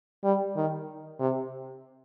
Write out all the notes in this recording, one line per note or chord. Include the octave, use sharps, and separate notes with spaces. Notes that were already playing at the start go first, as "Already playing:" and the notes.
G3
D#3
C3